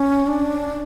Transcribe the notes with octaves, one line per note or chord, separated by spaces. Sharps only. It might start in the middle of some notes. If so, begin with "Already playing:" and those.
Already playing: C#4
D4